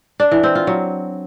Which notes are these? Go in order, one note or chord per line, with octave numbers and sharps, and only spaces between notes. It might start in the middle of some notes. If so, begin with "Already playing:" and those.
D4
E3
C4
F4
F#3